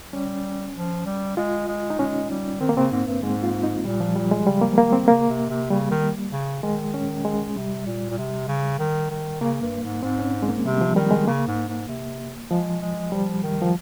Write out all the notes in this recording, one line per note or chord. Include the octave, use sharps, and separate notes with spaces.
G3 C#4
F3
G3
G#3 F4
G#3
D#4
G#3 C#4
G3
D#3 C4
A#3
C#3 C4
G#2
G2
G#2 G#3
F4
D#4
A#2 G3
F3
G3
G#3
C#3 G3
A#3
F3
D#3 A#3
C4
C#3 A#3
C3
C3
C#3 G3
D#3
C#3
D#3 G#3
C#4
G#3
C3 G3
A#2
A#2
C3
C#3
D#3
D#3
C#3 A#3
G2
G#2
G#2 C4
C#4
G#3
A#3
C3 G3
F3
D#3 G3
G#3
C#3 A#3
G#2
G#2
C3
F3 G#3
G#3
F3 G3
D#3
F3